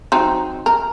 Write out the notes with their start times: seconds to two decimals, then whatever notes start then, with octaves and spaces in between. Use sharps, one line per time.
0.12 F#3 C4 D#4
0.66 A#4